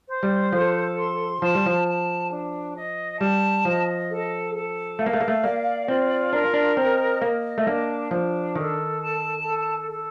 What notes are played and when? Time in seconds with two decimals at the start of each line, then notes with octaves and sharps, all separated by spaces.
0.09 C5
0.23 G3
0.53 F3 A4
0.98 C6
1.42 F3 A5
1.55 G3
1.66 F3
1.87 A5
2.32 D4
2.76 D#5
3.21 G3 A5
3.65 F3 D#5
4.10 A4
4.55 A4
4.99 A3 F5
5.06 A#3
5.13 A3
5.21 A#3
5.28 A3
5.44 A#3 D5
5.88 C4 F4
6.33 D4 A#4
6.54 D4
6.77 C4 D#5
7.22 A#3 D#5
7.58 A3
7.66 A#3 D4
8.11 F3 D4
8.55 D#3 A4
9.00 A5
9.44 A4
9.89 A4